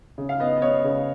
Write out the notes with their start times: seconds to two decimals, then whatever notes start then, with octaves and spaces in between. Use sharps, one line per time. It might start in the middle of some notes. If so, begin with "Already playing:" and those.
0.18 C#3
0.29 F5
0.40 B3 D#5
0.57 D#5
0.61 B3 C#5
0.84 C#3